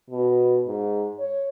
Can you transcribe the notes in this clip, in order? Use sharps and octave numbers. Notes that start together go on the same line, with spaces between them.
B2
G#2
C#5